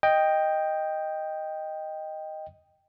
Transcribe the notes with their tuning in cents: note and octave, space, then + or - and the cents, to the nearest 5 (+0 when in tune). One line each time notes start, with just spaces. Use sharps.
D#5 +0 G5 +5